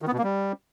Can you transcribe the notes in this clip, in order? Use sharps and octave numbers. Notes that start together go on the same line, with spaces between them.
D#3
B3
B2
A#3
G3